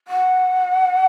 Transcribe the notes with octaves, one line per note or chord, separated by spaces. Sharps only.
F#5